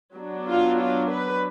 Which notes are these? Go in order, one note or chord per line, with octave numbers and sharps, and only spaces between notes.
F#3 B3 D4
F4
F4
B4